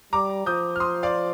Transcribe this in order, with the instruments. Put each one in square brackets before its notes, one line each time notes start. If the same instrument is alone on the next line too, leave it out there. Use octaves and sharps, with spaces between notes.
[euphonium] G3 [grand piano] A#5 D6
[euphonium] F3 [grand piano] D#6 G6
[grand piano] F6
C6 D#6
D5 F5